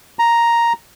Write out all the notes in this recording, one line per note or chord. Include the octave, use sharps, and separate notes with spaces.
A#5